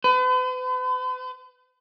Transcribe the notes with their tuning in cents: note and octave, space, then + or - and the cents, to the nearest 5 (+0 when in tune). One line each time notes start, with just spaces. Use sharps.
B4 +45